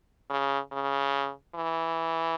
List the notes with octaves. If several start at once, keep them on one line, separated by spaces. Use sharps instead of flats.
C#3
C#3
E3